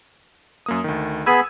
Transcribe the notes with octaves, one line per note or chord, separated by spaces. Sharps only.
F#2 A#3 D#6
D2 D#3
B3 G#4 B5 E6 G#6 D#7